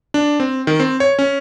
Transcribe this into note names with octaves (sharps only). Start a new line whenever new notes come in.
D4
C4
D#3
C4
C#5
C#4